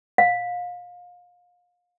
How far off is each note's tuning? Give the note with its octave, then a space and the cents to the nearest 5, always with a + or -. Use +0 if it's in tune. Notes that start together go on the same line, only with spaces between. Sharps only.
F5 +30